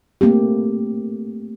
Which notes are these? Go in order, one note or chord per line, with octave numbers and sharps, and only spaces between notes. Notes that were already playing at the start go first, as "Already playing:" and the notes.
A3 A#3 C4 G4